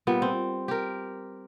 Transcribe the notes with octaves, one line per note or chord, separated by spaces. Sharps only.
A#2 G3 B3
C4
G4 A#4